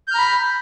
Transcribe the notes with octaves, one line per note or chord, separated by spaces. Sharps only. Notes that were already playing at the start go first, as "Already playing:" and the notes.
A#5 B5 F6 G6